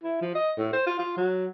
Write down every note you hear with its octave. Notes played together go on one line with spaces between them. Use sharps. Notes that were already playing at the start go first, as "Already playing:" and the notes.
E4
F3
D#5
A2
C5
F4
F4
F#3